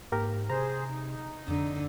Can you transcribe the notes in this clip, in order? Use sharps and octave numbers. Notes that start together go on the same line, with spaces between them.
G#2 A#3 G4 A#4
C3 G#4 C5 A#5
D#4
F2 D3